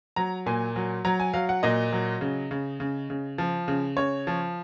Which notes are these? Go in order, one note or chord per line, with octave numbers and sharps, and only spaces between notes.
F#3 A#5
A#2 G#5
F#3
F#3 A#5
G#5
F#3 F5
F#5
A#2 D#5
F#3
C#3
C#3
C#3
C#3
F3
C#3
C#3 C#5
F3